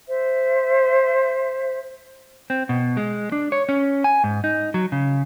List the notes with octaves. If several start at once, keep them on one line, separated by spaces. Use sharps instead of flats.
C5 E5
C4
B2
G#3
D4
C#5
C#4
G#5
G#2
D#4
F#3
C#3